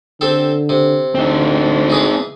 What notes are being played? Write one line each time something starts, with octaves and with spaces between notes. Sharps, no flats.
D3 C4 G4 A4
C3
D2 C4 D#4
E3 G#4 B4